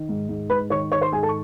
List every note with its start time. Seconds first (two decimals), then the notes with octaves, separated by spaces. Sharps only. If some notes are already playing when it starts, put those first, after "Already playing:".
Already playing: D#3
0.09 G#2
0.29 G#2
0.50 G#2 B4 B5
0.70 D#3 C#5 C#6
0.92 D#3 C#5 C#6
1.01 C5 C6
1.12 G#2 G#4 G#5
1.23 A4 A5
1.29 C#6